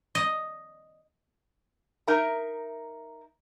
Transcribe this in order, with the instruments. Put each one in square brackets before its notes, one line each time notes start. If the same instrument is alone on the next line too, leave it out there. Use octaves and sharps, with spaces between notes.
[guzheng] D#5
[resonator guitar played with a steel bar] D#4 A#4 E5 A#5